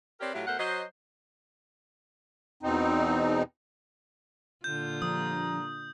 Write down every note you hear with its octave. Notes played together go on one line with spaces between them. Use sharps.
C4 G4 A#4 B4 C#5 D5
A2 F#3 A3 F4 G4
B2 A3 A#4 C5 F#5
F#3 C5 D#5
E2 B2 C4 D#4
A#2 D3 F4 G6
A#1 F3 G3 D4 A#5 D#6